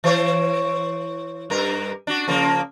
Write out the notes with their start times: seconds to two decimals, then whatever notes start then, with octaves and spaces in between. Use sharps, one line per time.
0.04 E3 C5 C#5
1.50 G2 A#4
2.07 D4 F#4
2.28 C#3 F3 A#3